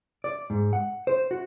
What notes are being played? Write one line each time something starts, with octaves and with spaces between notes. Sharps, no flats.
D5
G#2
F#5
C5
F#4